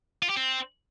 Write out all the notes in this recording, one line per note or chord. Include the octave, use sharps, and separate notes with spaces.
F4
G4
C4